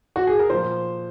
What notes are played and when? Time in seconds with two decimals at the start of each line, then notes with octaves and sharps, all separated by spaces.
0.16 F#4
0.27 G#4
0.39 A#4
0.50 A#2 F3 C5